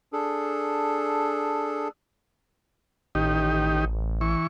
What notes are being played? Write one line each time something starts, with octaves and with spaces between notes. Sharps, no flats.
D4 G#4 A4
A1 D#3 D#4 G4
E3 C#6